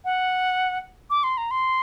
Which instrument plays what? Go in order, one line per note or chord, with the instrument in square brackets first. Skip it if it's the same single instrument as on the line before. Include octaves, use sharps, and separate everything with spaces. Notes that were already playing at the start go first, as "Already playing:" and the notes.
[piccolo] F#5
D6
C6
A#5
C6